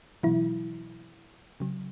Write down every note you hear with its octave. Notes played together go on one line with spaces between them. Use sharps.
B2 E3 F#3 E4
C#3 F#3